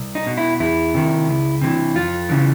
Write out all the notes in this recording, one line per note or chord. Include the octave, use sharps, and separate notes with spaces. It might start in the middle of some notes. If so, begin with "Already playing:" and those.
Already playing: C2
D#4
B2
E4
E2 E4
C3 D#3
C#2
C3 E3
F2 F4
C#3 E3